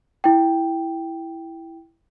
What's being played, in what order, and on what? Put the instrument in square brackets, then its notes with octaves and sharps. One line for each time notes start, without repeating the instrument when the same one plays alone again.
[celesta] E4 G5